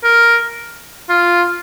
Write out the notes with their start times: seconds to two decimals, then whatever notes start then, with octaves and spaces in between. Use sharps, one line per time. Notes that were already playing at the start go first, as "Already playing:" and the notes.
0.04 A#4
1.10 F4